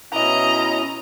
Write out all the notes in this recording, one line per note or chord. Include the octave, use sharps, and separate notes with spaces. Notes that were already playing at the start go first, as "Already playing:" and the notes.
B2 C#4 E4 D#5 A#5